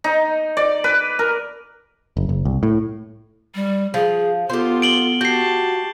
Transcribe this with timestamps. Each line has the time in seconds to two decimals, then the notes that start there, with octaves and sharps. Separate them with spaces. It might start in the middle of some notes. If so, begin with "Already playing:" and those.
0.04 D#4
0.57 D5
0.84 B4
1.19 A#4
2.17 F#1
2.29 F#1
2.45 C2
2.63 A2
3.55 G3
3.94 F3 G#4
4.50 B3 F4 G4 A4 C5
4.82 D7 F#7 G7
5.21 F#4 G4 A5 G6 C7